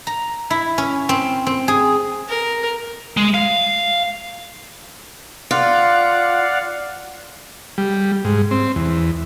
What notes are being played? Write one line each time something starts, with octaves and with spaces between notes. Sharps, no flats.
A#5
E4
C#4
C4
C4
G#4
A#4
G#3
F5
F4 D5 F5 F#5
G3
G#2
C4
E2